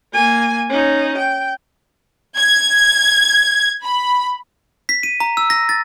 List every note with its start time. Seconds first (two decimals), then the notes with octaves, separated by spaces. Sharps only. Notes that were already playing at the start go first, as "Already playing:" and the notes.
0.12 A#3 G#5
0.69 C#4 D#4
1.17 G5
2.38 G#6
3.83 B5
4.89 B6
5.03 D#7
5.20 A#5
5.37 E6
5.50 A#6
5.69 A6